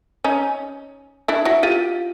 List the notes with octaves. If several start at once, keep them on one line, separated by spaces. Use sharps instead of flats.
C#4 D#4
D4 E4
E4 F#4
F4 G4